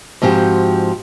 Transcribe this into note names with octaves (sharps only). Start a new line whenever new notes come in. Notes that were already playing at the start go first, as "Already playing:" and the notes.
G#2 F3 C4 F#4 G4